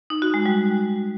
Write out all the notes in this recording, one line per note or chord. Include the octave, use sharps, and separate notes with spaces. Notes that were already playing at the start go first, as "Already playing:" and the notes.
D#4
F#4
G#3
G3